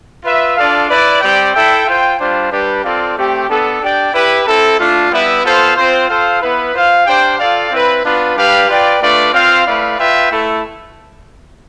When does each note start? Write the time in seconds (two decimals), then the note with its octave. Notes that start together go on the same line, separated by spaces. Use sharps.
0.24 F4 B4 E5
0.57 D4 F4 A4 D5 F5
0.89 E4 B4 D5
1.21 G3 C4 G4 D5 G5
1.55 E4 A4 E5 G5
1.87 F4 C5 G5
2.19 G3 D4 F4 C5
2.52 G3 D4 G4 B4
2.84 C4 F4 A4 D5 F5
3.16 A3 C4 G4
3.49 B3 D4 A4
3.82 D4 G4 D5 G5
4.14 E4 G4 B4
4.47 C4 E4 A4
4.79 A3 D4 F4
5.11 G3 B3 E4 B4 E5
5.43 B3 F4 A4 C5 F5
5.76 C4 F4 C5
6.08 F4 A4 C5 F5
6.42 B3 E4 B4
6.74 F4 C5 F5
7.06 D4 G4 C5 G5
7.39 F4 A4 D5 F5
7.71 C4 E4 B4
8.04 B3 D4 F4 B4
8.36 G3 D4 G4 B4 F5
8.69 F4 B4 D5 G5
9.02 A3 D4 F4 B4 D5
9.33 C4 F4 C5 F5
9.66 A3 E4 B4 D5 F5
9.99 F4 B4 E5 G5
10.31 A3 E4 A4